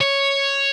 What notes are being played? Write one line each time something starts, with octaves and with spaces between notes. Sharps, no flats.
C#5